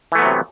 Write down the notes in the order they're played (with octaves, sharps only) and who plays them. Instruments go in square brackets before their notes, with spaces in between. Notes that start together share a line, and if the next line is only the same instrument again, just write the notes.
[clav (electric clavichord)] E3
A3
B3
F#3
C3